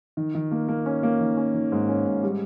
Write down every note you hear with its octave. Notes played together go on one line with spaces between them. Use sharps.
D#3
D#3
A#3
A#3
C#4
A#3
D#3
C#4
D#3
G#2
C#4
G#2
G3